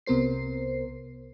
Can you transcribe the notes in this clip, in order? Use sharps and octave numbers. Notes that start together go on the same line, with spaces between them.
C2 C3 B3 A#4 C5 C7